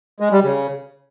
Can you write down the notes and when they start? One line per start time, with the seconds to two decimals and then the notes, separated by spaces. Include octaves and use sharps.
0.20 G#3
0.32 G3
0.43 C#3